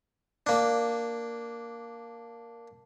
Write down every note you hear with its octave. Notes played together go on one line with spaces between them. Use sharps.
A#3 D4